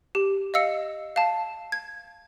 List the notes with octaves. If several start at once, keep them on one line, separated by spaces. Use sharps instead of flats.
G4
D#5 F5 E6 C#7
F5 A5
G#6